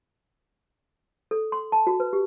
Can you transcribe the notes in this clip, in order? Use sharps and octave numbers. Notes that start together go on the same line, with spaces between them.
A4
C6
A5
F#4
B4
G4